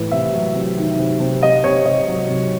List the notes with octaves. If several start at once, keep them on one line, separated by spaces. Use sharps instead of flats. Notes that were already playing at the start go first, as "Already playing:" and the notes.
Already playing: A2 E3
C3 E5
F#3
C3
D#3
C3
C3
C3 D#5
C3 C#5
C3 D#5
F#3
C3